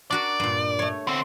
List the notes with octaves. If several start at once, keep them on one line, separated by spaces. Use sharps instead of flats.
D4 F#4 A#4 D5
G2 A#2
A3 C#5
D3 C4